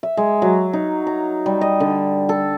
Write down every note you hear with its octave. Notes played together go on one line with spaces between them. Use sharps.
E5
G#3
F#3
D#4
A#5
G3
D#5
D3
A4